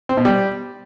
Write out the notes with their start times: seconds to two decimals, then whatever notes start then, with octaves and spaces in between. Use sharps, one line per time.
0.09 C4
0.17 B2
0.25 G3